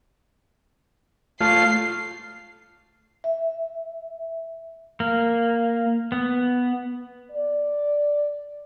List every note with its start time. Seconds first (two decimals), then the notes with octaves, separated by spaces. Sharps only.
1.41 A3 F4 C7
3.24 E5
5.00 A#3
6.12 B3
7.31 D5